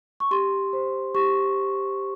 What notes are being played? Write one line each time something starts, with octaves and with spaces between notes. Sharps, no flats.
C#6
G4 C6
C5
G4 C#6